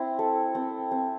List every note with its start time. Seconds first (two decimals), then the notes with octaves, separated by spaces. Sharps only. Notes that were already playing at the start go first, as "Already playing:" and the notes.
Already playing: C4 E4
0.19 A4
0.55 C4
0.91 C4